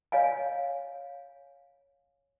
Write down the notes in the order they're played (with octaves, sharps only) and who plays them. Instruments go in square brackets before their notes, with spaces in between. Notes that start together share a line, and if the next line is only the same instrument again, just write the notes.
[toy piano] C#5 D#5 F5 G#5